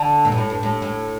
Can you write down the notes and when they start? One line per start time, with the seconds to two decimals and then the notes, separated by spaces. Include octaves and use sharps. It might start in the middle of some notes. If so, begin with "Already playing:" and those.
Already playing: D3
0.25 A#2
0.32 G2
0.38 A2
0.50 G2
0.63 A2
0.82 A2